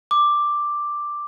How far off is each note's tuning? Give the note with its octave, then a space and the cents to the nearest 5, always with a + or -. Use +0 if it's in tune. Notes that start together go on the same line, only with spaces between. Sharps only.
D6 +5